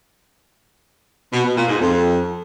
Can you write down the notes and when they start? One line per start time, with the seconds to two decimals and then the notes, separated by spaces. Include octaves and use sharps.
1.33 B2
1.45 B2
1.57 A#2
1.69 G#2
1.80 F2